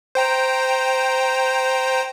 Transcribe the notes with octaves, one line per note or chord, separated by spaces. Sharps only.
C5 G5 A#5